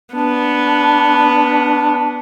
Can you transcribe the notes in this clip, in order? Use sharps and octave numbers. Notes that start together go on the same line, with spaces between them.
B3 D4